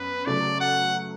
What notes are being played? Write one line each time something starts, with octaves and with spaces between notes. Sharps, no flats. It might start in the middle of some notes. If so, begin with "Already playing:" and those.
Already playing: F#2 B3 B4
C#3 F#3 A3 D5
F#5